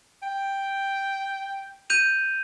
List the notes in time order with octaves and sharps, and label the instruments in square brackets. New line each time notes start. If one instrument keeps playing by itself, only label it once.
[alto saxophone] G5
[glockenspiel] G6 D#7 F7